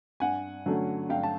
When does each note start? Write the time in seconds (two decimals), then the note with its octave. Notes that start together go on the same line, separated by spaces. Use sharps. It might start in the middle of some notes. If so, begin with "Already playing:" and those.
0.20 G2 F#5 G#5
0.66 D3 F#3 A3 C#4
1.09 G2 F5 G5
1.23 A5